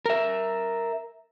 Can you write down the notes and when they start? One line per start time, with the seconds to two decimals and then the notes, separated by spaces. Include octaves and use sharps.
0.06 A#4 E5